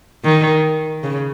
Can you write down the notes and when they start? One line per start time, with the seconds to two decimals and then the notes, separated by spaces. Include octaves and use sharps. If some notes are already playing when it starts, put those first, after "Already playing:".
0.24 D#3
1.03 C#3